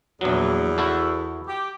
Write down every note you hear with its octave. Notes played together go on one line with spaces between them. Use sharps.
A#1 E2 F#3
E4 F#4 A4
G4